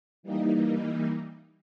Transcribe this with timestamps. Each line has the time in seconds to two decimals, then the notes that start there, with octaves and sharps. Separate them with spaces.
0.23 E3 G3 A#3 D#4